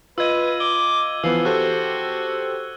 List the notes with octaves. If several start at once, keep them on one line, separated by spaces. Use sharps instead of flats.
F4 B4 D#5 E6 G#6 D#7
D6 G7
E3 F3 B3 F5 E6
F#4 G4 A4 C5 F#6